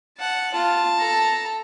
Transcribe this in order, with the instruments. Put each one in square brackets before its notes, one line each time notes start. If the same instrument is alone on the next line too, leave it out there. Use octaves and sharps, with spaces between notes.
[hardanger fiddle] F#5 A5
[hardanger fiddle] F4 F5 [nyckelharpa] A5
[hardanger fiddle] A4 A#5